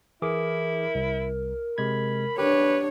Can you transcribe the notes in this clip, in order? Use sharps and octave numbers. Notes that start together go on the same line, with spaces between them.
E3 E4 G#4 A#4 D6
C2
C3 G#3 B5 G#6
D4 G4 B4 C#5